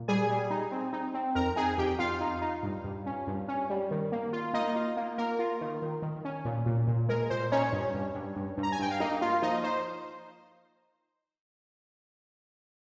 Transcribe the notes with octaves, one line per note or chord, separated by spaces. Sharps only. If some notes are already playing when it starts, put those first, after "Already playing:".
Already playing: A#2
G3 G#4 G#5
G3
D#4
C4
D#4
C4
F2 A#4 A#5
D#4 G#4 G#5
F2 G4 G5
F2 F4 F5
D#4
D#4
G2
G2
C#4
G2
C#4
G3
D#3
A#3
F4
A#3 D#4 D#5
F4
A#3
A#3 A#4
F4
D#3
D#3
D#3
C#4
A#2
A#2
A#2
G#3 A#4
A#2 C5
C#4 D#4 C#5
G2
G2
G2
G2
G2
A#5
G#5
G2 G5
F5
A#3 D#4 D#5
A#3 F4 F5
F3 D#4 D#5
D#4 C5